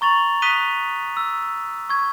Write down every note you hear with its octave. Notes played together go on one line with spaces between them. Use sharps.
A#5 C#6 A6 F7 F#7
D#6 F#6 B6 D#7 F7 G7
E6
C#6 G#6